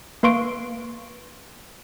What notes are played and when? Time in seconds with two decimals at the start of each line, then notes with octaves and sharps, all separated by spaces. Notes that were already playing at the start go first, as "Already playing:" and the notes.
0.23 A#3 B4 F5 C6 C#6 D7